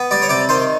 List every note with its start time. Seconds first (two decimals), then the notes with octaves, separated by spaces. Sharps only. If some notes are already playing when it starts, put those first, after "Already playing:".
Already playing: B3
0.11 G3 D5
0.22 C#5
0.29 C3 D5
0.49 D#3 C5